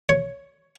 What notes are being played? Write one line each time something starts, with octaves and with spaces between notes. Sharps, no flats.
C#5